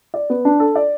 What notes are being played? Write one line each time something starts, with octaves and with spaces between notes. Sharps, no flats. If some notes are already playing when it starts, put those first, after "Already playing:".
D5
B3
D4
A4
D5